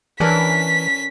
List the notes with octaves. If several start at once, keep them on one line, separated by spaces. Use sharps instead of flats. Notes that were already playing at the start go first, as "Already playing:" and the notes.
E3 C#4 D4 A#4 B6